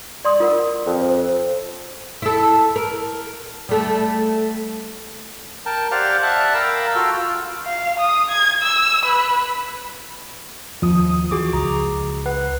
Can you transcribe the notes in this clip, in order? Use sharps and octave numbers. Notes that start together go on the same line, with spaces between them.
D5 C6 D#6
F4 A#4 F#5
F2
C5
E4 A4
A#4
G3 A3
A#4 G5 A5
G4 C5 D5 F5 F#5 F6
D5 E5 F#5 A5 F#6
A#4 F5 G5 A#5 B5 E6
F4 F#4 A4 G5 E6 F6
F4
F5
D#6
G#6
E6
B4
D#2 F3 D#6
E3 F#4 G#4 D6
C#2 A#5
B4 F#5